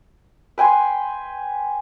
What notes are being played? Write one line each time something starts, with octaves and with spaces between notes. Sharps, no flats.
B4 G5 G#5 C6